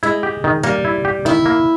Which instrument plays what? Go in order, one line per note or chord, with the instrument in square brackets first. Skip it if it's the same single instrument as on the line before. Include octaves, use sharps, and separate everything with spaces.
[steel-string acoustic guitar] G#3 [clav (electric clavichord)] E4
[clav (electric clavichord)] G4
D#3
[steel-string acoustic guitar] G3 [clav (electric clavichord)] A#3
[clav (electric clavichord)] E4
G4
[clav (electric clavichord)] D#3 [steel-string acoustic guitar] E4
[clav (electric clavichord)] A#3